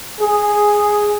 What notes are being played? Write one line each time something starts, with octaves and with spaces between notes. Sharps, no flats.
G#4